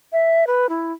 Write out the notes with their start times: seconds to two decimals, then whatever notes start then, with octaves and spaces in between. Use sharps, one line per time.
0.12 E5
0.47 B4
0.69 E4